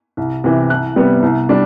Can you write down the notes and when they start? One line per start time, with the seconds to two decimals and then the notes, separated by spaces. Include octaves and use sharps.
0.17 C2
0.44 C3 E3
0.70 C2 F#6
0.96 C3 G3 B3
1.22 C2
1.49 G3 D4